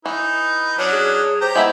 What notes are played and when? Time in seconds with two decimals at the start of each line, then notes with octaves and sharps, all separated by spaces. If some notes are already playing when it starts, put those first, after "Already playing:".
0.06 E3 D#4 B4
0.78 F#3 C#4 D4 C#5
0.93 G#4
1.41 G4 C5 G5 A#5
1.55 G#3 B3 E4 E5